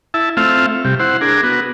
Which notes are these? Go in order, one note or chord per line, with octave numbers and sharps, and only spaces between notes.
E4 E5 A5
A3 C4 F4 E5 F5
C3 G3
E4 C5 F#5
D4 G#4 A#4
B3 F#4